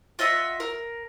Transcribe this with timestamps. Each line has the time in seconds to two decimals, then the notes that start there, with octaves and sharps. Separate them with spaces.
0.19 F4 D#5 E5 F#5
0.60 A#4